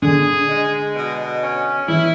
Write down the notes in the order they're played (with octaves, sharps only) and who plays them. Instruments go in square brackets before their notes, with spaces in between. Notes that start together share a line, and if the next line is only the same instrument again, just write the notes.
[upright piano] D3 [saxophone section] G#4
[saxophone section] G#3
B2
C#4
[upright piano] E3 [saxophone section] E4